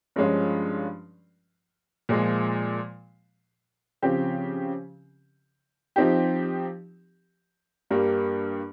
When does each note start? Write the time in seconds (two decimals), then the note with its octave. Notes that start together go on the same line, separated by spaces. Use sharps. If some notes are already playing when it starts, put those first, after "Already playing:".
0.16 G2 F3 G#3 C#4 F4
2.09 A#2 F3 G#3
4.02 C#3 F3 C4 G4
5.96 F3 C4 D#4 G4
7.90 G2 G3 A#3